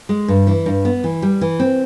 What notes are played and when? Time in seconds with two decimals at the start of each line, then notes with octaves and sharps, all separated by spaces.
0.09 G#3
0.28 G2
0.47 E3
0.66 G2
0.85 B3
1.04 E3
1.22 G3
1.41 E3
1.60 C4